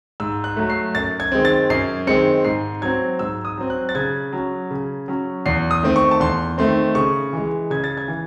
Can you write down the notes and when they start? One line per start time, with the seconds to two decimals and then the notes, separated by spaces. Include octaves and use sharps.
0.20 G#2 E6
0.44 F#6
0.56 F#3 A3
0.70 C7
0.95 F#2 A6
1.20 G#6
1.32 D#3 G#3 C4
1.45 A6
1.70 F#2 C7
2.07 D#3 G#3 C4 C#7
2.45 G#2 C7
2.82 F#3 C4 G#6
3.19 G#2 E6
3.45 D#6
3.58 F#3 C4
3.70 F#6
3.89 A6
3.95 C#3 G#6
4.33 F#3 C#4
4.71 C#3
5.08 F#3 C#4
5.46 E2 C7
5.71 D#6
5.83 D#3 A3 C4
5.96 C#6
6.11 A5
6.20 E2 C6
6.58 D#3 A3 C4 C6
6.95 C#3 C#6
7.33 E3 G#3
7.70 C#3 G#6
7.84 A6
7.97 G#6
8.08 E3